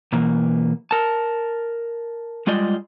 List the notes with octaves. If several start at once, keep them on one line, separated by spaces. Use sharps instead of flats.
B2 E3 A#3
A#4 A5
G3 G#3 F4 D5 D#5